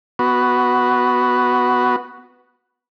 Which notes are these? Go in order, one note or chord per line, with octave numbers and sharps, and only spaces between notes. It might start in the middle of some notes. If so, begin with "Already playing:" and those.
B3 F#4